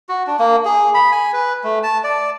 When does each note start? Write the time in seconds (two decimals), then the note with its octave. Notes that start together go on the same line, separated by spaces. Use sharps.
0.09 F#4
0.27 D4
0.39 A#3
0.65 G#4
0.94 B5
1.12 G#5
1.33 B4
1.64 A3
1.83 A5
2.04 D5